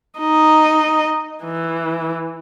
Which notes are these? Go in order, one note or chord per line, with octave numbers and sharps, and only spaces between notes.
D#4 D#5
E3